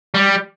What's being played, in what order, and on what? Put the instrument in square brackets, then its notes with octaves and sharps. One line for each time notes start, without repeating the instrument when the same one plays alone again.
[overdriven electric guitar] G3